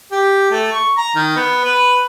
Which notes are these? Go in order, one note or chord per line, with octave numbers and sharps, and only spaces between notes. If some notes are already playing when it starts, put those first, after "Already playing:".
G4
A3
C#6
A#5
D#3
B3
B4